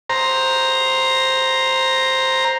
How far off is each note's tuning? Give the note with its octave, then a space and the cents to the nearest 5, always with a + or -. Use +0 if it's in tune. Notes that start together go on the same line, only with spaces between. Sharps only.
C5 +5 A#5 +0